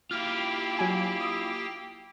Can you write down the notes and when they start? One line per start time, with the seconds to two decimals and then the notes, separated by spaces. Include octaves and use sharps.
0.11 A#3 E4 F4 G4 G5 F6
0.79 F#3 G#5
1.20 D#6 E6